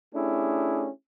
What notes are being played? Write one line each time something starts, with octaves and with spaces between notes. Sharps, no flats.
A3 C#4 D4 E4 G4 G#4